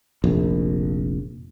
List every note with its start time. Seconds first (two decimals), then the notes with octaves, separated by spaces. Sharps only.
0.24 F1 A#1